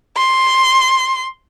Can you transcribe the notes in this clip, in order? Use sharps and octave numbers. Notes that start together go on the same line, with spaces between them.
C6